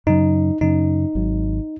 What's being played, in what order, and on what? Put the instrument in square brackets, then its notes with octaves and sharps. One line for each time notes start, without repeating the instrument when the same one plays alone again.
[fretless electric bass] F#2 C#3 F#3 C#4 [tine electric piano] D#4
[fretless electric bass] F#2 C#3 F#3 C#4 [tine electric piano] D#4
[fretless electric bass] G#1 G#2 F#3